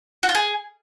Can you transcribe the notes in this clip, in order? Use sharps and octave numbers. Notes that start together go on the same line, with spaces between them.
F#4
F4
G#4